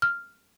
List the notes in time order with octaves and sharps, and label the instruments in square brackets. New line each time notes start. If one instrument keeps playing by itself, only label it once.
[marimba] F6